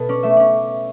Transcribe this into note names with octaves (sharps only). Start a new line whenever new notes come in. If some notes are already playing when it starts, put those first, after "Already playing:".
Already playing: B2 A4 B4
C#4 D5
A3 E5
C#4 D5